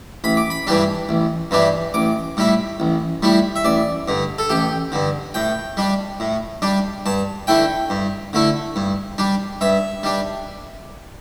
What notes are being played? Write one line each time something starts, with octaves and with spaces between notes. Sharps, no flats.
A1 B5
D6
B5
G2 E3 G3 D4
A1
G2 E3 G3 D4
A1 D6
A2 G3 E4
A1
A2 G3 E4
E5
A1 D5
G2 D3
A4
A1 G4
G2 D3
A2 G5
G3 D4
A2
G3 D4
G2 A5
D3 A3 E4 G5
G2
D3 A3 E4
G2
G3 D4
G2 E5
G3 D4